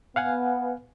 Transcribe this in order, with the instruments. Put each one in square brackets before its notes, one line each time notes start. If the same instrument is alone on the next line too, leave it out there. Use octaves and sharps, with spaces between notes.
[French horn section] B3 [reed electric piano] F5 F#5 G#5